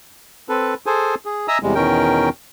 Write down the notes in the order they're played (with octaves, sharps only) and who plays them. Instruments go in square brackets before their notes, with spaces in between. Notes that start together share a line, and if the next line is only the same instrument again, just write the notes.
[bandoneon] C4 A4 B4
G#4 A4 C5 G#5
G#4
D#5 E5 G#5 A#5 D#6 E6
E2 C3 G3 G#3
E2 B2 D#3 C#4 A#4 G5